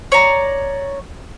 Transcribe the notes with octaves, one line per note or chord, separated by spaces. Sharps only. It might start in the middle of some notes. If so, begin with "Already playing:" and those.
C#5 D5 A#5